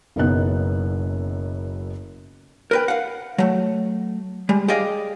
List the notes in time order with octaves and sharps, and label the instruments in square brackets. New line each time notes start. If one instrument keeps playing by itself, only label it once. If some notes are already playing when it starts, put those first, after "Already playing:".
[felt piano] F#1 F#2 B2 B3 D#4 F#6
[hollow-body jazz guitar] A#4 B4 G5
F5 F#5
F#3 A3
G3 G#3
G4 G#4 D5 D#5 F5